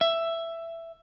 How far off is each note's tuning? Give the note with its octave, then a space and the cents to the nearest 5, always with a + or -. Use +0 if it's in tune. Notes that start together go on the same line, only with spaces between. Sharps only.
E5 +10